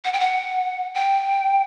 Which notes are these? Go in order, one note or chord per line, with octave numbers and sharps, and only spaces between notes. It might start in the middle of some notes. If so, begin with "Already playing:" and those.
F#5
G5
F#5
G5